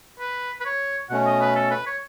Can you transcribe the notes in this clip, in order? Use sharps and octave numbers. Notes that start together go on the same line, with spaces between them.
B4
B4
C#5
B2 A3 C#4 F#5
D#5
B4
A4
B4
C#5